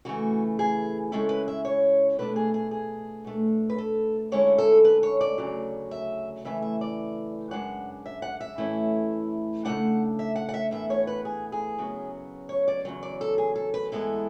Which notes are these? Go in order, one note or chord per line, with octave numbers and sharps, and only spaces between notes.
C#3 E3 A3 F#4
G#4
C#3 G#3 C#4 E4 A4
B4
E5
C#5
B2 A3 D4 B4
G#4
G#4
G#4
B2 A3 D4
B4
A4
D3 G#3 C#4 E4 C#5
A4
B4
C#5
D5
D2 C#3 F#3
E5
C#3 E3 A3 E5
E5
D5
F#2 C#3 G#3 D4 F#5
E5
F#5
E5
A2 E3 A3 C#4 E4
C#3 F#3 A3 D4 F#5
E5
F#5
F#5
E5
A2 E3 B3 E5
C#5
B4
G#4
G#4
F#2 C#3 F#3 B3
C#5
D5
E2 C#3 F#3
D5
A4
G#4
A4
B4
G#2 E3 G#3 B3 E4 A4